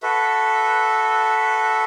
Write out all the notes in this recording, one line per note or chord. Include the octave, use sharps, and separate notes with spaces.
F#4 A4 B4 E5